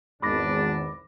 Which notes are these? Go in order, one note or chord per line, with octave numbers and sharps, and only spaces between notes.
G#1 E2 D#3 D4 B5 D6 A#6